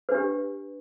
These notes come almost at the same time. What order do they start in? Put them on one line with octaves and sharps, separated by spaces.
B4 D4 G4